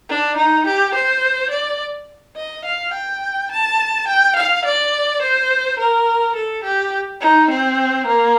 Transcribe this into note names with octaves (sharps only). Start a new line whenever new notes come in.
D4
D#4
G4
C5
D5
D#5
F5
G5
A5
G5
F5
D5
C5
A#4
A4
G4
D#4
C4
A#3